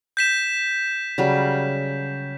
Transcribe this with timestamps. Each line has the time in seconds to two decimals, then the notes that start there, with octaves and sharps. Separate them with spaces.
0.17 G6 B6 E7
1.18 C#3 F#3 G3